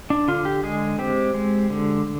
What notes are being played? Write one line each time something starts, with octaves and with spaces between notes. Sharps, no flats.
D4
D3 F4
G4
G#3 G#4
C4 G4
G#3
D3